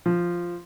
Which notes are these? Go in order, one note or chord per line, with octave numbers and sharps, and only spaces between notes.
F3